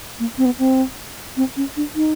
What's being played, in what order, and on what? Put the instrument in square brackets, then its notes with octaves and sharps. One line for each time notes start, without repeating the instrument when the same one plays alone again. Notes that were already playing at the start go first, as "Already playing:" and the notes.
[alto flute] A#3
C4
B3
C4
C4
C#4
D4
D#4